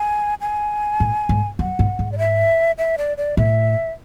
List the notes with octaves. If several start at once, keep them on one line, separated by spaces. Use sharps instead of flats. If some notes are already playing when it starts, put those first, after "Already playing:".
Already playing: G#5
G#5
A2
G#2
F#2 F#5
G#2
G#2
D5
E5
E5
D5
D5
A2 E5